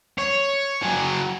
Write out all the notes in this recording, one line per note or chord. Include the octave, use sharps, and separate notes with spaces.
C#5
F#3 G#4